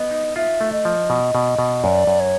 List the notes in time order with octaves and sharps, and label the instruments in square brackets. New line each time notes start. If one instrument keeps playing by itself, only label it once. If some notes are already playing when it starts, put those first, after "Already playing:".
Already playing: [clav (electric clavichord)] B3 [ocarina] D#5
[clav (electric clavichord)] D#4
[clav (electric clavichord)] F4 [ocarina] E5
[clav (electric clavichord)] A3
[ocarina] D#5
[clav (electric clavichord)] F3
B2
B2
B2
[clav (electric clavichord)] F#2 [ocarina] D5
[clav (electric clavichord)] F#2
[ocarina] C#5